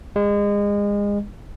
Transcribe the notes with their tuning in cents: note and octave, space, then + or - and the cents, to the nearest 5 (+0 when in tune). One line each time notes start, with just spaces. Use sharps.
G#3 -30